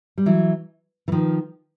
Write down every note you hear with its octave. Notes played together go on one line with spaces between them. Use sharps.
G3
E3 F#3
E3
D#3 F3